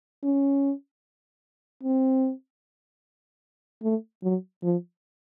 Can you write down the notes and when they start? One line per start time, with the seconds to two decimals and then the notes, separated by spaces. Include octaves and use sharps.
0.24 C#4
1.83 C4
3.83 A3
4.23 F#3
4.63 F3